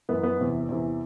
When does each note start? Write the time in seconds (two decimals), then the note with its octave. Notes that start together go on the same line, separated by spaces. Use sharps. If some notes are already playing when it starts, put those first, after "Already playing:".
0.09 F#2 E3 B3
0.23 B3
0.39 E2 C3 E3
0.69 E2 C3 E3